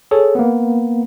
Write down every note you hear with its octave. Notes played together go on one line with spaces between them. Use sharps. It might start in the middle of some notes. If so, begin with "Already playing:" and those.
G#4 A4 C#5
A#3 B3